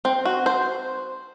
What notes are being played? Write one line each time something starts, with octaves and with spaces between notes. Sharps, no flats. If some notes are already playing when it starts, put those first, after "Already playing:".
C4
F#4
C5